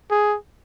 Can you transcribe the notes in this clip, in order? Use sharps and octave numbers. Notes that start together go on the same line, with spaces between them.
G#4